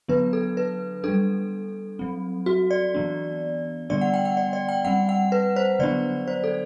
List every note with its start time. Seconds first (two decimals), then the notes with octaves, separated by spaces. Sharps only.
0.08 D3 F#3 B3 D4 B4
0.33 A4
0.57 B4
1.03 G3 D4 A4
1.99 F#3 C4
2.46 F#4
2.71 D5
2.94 E3 B3 D4
3.90 D3 G3 B3 D4 D5
4.01 F#5
4.14 G5
4.25 F#5
4.37 D5
4.53 D5
4.69 G5
4.85 G3 C4 F#5
5.09 F#5
5.32 B4
5.56 C5
5.79 D3 F#3 B3 D4 D5
6.28 C5
6.44 A4